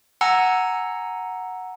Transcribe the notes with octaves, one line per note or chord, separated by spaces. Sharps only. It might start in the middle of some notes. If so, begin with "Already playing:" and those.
F#5 G#5 A#5 E6 C#7